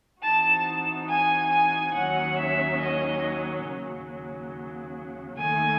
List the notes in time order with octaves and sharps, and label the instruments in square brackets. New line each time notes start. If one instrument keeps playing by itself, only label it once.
[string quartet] E3 C4 D#4 F#4 [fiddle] A5
[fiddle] G#5
G#5
[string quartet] D#2 D#3 F#3 C#4 [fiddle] F#5
[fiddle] E5
D#5
[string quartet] D#2 C#3 F#3
[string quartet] D#2 D#3 A3 [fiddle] G#5